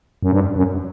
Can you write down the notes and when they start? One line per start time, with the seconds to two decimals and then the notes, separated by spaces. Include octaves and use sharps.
0.23 F#2
0.32 G2
0.56 F#2